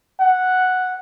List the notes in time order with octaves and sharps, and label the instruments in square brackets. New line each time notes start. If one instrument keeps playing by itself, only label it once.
[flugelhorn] F#5